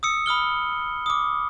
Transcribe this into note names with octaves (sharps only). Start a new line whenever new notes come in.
D#6 E6 C#7
B5 D#6 F6 G7
D6 D#6